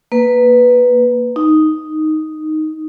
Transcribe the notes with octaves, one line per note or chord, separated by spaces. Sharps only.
A#3 B4
D#4